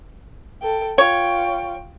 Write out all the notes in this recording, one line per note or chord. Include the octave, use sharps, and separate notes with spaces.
A4 G5
F4 C#5 G5